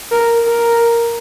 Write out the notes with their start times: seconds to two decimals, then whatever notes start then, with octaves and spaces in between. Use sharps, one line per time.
0.12 A#4
0.48 A#4